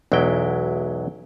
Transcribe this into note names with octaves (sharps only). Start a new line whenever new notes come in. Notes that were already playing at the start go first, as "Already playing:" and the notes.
B1 E2 F#3 G#3 E4 G5